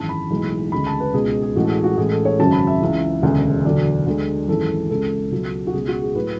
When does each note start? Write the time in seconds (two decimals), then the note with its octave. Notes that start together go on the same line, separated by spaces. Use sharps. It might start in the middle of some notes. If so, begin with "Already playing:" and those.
Already playing: G#1 F#2 E3 G#3 A5
0.09 B5
0.30 B1 A2 E3 G#3
0.72 D2 C#3 G#3 B5
0.87 A5
1.00 B4
1.14 C#2 B2 G#3 G#4
1.28 G#4
1.42 G#4
1.56 A1 A2 G#3 F#4
1.64 A4
1.69 G#4
1.84 F#4
1.97 A1 A2 G#3 G#4
2.12 A4
2.25 C#5
2.39 G#1 F#2 C#3 F#3 A5
2.53 B5
2.67 E5
2.81 C#2 C#3 E3
3.22 E1 D2 C#3 G#3
3.65 E1 D2 D3 F#3 D5
4.07 D2 D3 G#3
4.48 G#1 F#2 E3 G#3 A4
4.89 C#2 C#3 G#3 A4
5.31 C#2 B2 F#3
5.67 F#4
5.73 C#2 B2 G#3 G#4
5.88 F#4
6.02 G#4
6.15 A2 F#3 B4